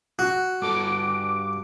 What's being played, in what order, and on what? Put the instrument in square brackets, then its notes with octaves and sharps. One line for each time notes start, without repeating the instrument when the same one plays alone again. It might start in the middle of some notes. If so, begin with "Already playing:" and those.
[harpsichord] F#4
[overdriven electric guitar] G2 A4 [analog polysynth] D6